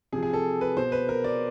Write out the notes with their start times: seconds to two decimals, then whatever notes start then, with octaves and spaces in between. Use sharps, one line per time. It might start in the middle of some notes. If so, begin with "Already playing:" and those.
0.13 C3 F3 G#4
0.23 G#4
0.33 A4
0.61 B4
0.77 B2 C5
0.92 B4
1.09 A#4
1.24 D5